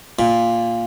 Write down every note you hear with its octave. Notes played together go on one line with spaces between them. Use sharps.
A#2